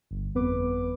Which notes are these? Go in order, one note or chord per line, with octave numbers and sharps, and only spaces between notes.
G1
G1 F2 B3 B4 D6